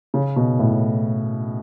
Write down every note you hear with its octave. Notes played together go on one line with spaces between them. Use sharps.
C#3
B2
A2